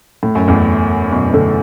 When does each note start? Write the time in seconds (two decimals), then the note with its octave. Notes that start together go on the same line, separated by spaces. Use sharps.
0.23 A2
0.35 F#2
0.48 E2 A2
1.12 F#2 B2
1.29 B2
1.34 A2 D3